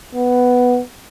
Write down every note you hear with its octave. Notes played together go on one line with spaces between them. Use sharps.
B3